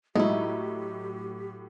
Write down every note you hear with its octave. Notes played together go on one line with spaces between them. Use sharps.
A2 F#3 G#3 D#4 E4 G4